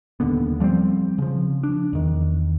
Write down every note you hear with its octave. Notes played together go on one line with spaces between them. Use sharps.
D#1 D#2 D3 B3
F3 G3 B3 C4
C#3 F3
D4
E2 D#3